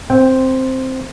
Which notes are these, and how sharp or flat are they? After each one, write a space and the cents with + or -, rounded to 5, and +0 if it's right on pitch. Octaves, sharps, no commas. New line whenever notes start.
C4 +0 G5 +0